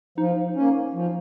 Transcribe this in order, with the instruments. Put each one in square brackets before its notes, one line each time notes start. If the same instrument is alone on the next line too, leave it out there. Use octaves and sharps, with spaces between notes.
[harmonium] F3 [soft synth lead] D#4
[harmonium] A#3 C#4
F3